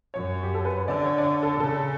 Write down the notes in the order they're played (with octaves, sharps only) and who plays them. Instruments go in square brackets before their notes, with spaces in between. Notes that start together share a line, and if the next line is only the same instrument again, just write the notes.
[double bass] F#2 [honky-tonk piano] C#5
[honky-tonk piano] G4
A4
B4
C#5
[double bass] D3 [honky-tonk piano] D5
[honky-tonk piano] C#5
D5
C#5
A4
[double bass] C#3 [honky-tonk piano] A4